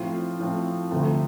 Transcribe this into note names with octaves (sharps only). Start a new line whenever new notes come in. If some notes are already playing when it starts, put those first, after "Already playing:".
Already playing: A2 F3 C4 F4
A2 F3 C4
D2 C3 F3 A3 C4